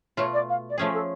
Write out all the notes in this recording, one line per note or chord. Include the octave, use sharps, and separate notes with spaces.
B2 A3 F4 C#5
D5
F5
D5
F3 A3 C#4 G#4 C#5
A4